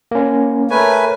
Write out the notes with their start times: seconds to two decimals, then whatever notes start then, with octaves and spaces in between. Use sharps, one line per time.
0.11 A#3 C#4
0.71 A3 A#4 B4 C#5 G#5